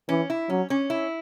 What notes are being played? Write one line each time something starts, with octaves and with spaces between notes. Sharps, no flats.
E3 C#4
E4
F#3 C#4
C#4
E4